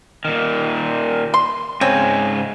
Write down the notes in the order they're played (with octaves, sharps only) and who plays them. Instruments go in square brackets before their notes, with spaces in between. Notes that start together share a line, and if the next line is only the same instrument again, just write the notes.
[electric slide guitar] A#2 D#3
[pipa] C6
[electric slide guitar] G#2 C#3 G#5 [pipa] C4 C#5